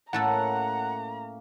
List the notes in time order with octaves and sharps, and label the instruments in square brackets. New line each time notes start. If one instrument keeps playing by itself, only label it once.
[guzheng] A2 A3 A4 [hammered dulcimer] A#3 C#4 [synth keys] F#5 [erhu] A#5